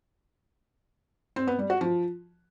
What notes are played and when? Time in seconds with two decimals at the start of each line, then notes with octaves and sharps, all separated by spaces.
1.36 C4
1.47 B3
1.59 G3
1.70 F#4
1.81 F3